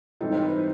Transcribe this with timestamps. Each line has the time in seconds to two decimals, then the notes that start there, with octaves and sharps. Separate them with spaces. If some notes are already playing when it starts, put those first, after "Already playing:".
0.21 G#2 E3 G3 C4 D#4 A4
0.33 C5
0.43 B4